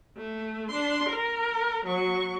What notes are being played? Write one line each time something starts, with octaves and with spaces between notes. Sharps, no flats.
A3
D4 C6
A#4
F#3 C#6